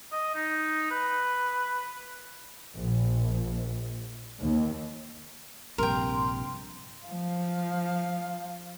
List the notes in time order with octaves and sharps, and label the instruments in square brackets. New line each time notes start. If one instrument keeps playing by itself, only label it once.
[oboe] D#5
D#4
B4
[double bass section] A#1
D#2
[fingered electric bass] A#1 G2 C3 [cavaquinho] A#4 G5 [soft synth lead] C6
[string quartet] F3 F5